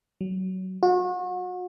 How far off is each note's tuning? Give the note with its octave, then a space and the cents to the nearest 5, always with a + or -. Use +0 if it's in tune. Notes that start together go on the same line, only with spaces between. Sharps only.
F#3 +20
F#4 -35